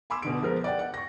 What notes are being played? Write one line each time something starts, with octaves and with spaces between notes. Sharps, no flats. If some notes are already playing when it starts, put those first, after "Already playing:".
G#5 B5 C6 D6 E6
B2 D3 D7
F3 G#3 B3 A#4 C5
D5 F#5 G5
F#5
C#6 A#6